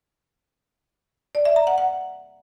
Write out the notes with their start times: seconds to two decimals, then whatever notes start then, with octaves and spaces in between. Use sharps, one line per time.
1.35 D5
1.45 E5
1.56 A#5
1.67 F#5
1.78 F#5